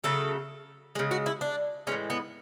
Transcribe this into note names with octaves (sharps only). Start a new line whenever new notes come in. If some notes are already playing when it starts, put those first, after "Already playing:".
C#3 F#3 A3 A4
C#3 G#3 G#4
F#4
E4
D4
A2 E3 G#3 C#4
B3